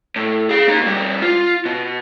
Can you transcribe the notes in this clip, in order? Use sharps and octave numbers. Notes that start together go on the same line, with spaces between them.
A2
G#4 F5
A#3 D#4
B2 G3
F4
B2